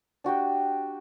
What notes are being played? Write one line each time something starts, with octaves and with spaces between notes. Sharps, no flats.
D4 F#4 G4 G5